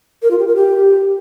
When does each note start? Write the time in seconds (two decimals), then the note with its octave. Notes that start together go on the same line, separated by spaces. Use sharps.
0.22 A#4
0.31 F4
0.39 G4
0.47 A#4
0.55 G4